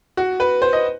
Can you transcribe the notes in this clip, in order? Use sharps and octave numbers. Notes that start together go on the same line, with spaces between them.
F#4
B4
C5
D#5